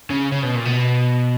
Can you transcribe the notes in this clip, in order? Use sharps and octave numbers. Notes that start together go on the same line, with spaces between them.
C#3
C#3
B2
A#2
B2